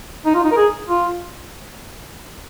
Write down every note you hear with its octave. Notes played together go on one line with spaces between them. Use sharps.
D#4
F4
D#4
A#4
G#4
F4